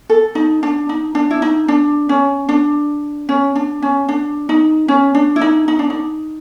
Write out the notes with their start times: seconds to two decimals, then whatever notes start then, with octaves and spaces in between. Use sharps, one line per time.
0.09 A4
0.35 D#4
0.63 D4
0.89 D#4
1.15 D4
1.31 E4
1.42 D#4
1.68 D4
2.09 C#4
2.49 D4
3.29 C#4
3.56 D4
3.82 C#4
4.09 D4
4.49 D#4
4.88 C#4
5.15 D4
5.36 E4
5.41 D#4
5.68 D#4
5.79 D4
5.90 D#4